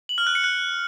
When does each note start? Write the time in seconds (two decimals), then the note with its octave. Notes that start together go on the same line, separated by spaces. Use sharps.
0.09 F#7
0.18 F6
0.27 F#6
0.35 C#7
0.44 F#6